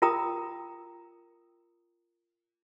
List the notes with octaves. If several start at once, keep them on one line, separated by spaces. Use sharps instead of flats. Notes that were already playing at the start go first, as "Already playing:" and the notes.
F4 A#4 G5 A#5 D#6